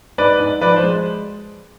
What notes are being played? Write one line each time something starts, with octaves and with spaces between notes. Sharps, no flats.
G#2 B4 D5
G#2
F3 B4 D5
C5
G#3